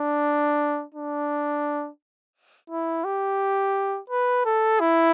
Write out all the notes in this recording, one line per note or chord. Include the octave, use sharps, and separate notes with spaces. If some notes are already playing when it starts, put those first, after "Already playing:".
Already playing: D4
D4
E4
G4
B4
A4
E4